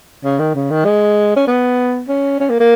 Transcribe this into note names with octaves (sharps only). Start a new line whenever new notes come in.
C#3
D#3
C#3
D#3
G#3
C#4
B3
C#4
C#4
A#3
A#3